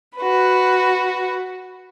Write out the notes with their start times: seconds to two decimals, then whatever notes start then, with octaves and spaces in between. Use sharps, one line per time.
0.16 F#4 B4